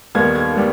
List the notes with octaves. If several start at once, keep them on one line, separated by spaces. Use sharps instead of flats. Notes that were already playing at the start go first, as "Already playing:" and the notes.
D#2 D#3 G3 B3 G#6
G#6
G3 B3